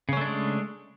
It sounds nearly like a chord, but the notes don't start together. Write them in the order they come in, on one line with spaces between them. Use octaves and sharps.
C#3 C#4 A3 D4 G#3